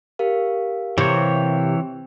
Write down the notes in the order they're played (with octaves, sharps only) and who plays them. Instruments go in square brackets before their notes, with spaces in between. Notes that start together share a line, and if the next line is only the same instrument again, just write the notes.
[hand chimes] G4 A#4 F5
[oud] C3 [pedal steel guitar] E3 C#5